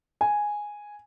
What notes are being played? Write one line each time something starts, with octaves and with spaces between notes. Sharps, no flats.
G#5